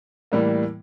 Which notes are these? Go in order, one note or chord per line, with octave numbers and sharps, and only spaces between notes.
A2 E3 G3 A#3